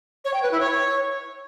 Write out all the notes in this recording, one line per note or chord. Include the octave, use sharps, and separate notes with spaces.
C#5
G5
B4
E4
C#5